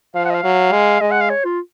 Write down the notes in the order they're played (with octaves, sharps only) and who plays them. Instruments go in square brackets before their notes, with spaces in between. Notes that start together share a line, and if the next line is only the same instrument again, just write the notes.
[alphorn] F3 [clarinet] F5
[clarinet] F#5
D#5
F5
[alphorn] F#3
G#3
[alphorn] G#3 [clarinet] D#5
[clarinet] F#5
F5
C#5
F4